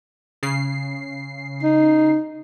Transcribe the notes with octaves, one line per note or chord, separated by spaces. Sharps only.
C#3 C7
D#4